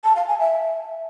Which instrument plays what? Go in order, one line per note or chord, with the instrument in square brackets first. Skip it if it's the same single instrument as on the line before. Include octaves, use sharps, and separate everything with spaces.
[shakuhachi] A5
F5
G#5
E5